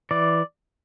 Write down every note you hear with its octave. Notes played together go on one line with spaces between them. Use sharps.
E3 D5